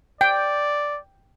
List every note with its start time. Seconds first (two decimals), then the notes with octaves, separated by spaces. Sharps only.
0.21 D5 G5